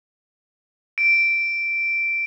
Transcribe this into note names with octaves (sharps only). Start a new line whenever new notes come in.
D7